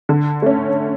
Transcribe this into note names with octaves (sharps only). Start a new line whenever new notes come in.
D3
A3 C#4